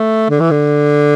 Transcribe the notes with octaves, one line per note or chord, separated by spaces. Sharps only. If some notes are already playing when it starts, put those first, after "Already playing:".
Already playing: A3
D3
E3
D3